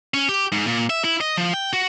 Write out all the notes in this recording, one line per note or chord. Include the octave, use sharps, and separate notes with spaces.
C#4
G4
G#2
A#2
E5
E4
D#5
F3
G5
F#4